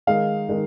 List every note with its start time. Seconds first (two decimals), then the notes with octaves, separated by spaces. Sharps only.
0.07 D#3 G#3 D#4 F5
0.49 D#3 G#3 D#4